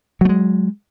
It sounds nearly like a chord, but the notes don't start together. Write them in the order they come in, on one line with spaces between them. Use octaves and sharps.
F#3 A3 G#3